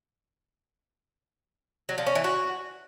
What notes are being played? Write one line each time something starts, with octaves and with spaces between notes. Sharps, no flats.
F#3
F3
C#4
E3
F#4